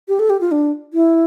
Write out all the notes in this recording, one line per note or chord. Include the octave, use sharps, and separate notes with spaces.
G4
A4
G4
F4
D4
E4